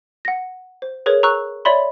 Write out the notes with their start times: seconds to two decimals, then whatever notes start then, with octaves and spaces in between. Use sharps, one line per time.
0.25 F#5 A#6
0.82 C5
1.06 G#4 A#4 B4 C#5
1.23 A#5 C#6 E6 F#6
1.65 C#5 D5 E5 B5 C6